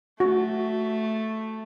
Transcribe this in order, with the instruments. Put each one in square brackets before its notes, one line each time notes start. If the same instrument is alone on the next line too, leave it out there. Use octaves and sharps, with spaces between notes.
[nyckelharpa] A3 [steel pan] F#4